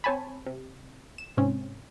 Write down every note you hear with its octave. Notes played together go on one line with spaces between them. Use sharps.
C4 C5 C#5 G#5 A5 B5
C3
E7
G#2 C3 C4 C#4